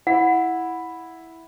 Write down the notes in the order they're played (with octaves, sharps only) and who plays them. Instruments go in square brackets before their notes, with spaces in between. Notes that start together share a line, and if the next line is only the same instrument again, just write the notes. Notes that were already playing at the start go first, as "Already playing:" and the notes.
[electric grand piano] E4 [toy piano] F#5